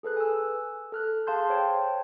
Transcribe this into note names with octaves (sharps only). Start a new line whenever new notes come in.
G#4 A4 B4 F#6
G#5 E6
A4 F6 F#6
G#4 F5 A5 C6 G6
C5 C#5 G5 A5